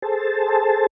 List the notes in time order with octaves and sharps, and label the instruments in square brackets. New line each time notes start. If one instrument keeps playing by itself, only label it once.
[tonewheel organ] G#4 A4 C5 A5